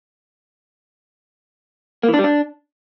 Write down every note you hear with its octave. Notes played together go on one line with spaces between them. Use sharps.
A#3
E3
D4
G3
D4